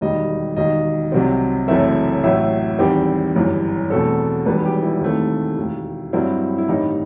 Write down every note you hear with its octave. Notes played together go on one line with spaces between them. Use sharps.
E1 D#2 D#3 G3 D#5
E1 D#2 D#3 D#5
C2 C3 F#3 C4
F#1 F#2 E3 A3 C4 E5
A1 A2 F#3 E5
E2 D#3 G3 C4 G4
G1 F#2 E3
E2 B2 A3 C4 A4
E1 E2 D#3 G3 B4
G4
E4
D#2 D#3 A3 C4
E1 D#2 D#3
G2 F#3 C4 E4
E4
A1 G2 D#3 G3 D#4